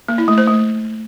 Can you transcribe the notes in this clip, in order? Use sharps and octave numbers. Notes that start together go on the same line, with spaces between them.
A#3
E4
A3
C5
A3